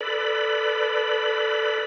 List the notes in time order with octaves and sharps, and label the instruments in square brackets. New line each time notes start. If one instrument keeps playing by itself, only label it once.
[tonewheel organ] A4 B4 D5 B5